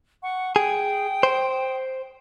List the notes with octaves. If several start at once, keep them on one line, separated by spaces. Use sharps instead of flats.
F#5 C#6
G#4 G5 D#6
C5